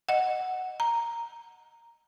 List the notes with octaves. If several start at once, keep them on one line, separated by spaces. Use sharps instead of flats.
D#5 F#5
A#5